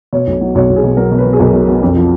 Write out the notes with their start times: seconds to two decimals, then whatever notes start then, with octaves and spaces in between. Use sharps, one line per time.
0.13 B2 C#5
0.27 B1
0.41 F#3
0.55 B1 C#5
0.69 B1
0.76 G#4
0.84 B2
0.97 F#3 A#4
1.11 B2
1.18 B4
1.25 B2
1.33 G#4
1.39 B1 A#4
1.53 B2
1.68 B2
1.82 F2
1.96 F3